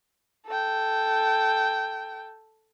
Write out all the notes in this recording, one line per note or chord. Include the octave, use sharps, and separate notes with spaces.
A4 G5